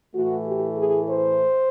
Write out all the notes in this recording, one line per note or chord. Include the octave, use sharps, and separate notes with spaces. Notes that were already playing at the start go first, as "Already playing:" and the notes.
A2 E3 A3 F#4
G4
G#4
C5